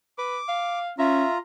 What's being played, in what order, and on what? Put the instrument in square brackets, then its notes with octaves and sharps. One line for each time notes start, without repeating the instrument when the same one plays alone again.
[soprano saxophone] B4 [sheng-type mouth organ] D6
[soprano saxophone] F5
[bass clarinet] C#4 [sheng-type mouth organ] F4 A#5 [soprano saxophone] E5